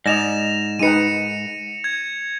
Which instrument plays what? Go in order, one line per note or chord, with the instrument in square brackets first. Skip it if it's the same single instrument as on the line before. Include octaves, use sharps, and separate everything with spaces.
[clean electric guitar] G#2 [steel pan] D5 D#5 [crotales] A#6 E7 F7
[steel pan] G#3 D#4 B4 [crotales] C#7 D#7
[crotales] G#6